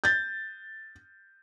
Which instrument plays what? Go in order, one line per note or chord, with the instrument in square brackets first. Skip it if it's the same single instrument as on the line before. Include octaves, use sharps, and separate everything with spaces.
[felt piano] G6 A6